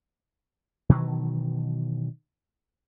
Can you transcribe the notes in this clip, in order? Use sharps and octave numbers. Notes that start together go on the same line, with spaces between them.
B2 D#3 E3 F#3